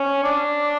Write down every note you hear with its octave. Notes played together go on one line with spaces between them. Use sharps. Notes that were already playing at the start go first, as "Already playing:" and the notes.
Already playing: C#4
D4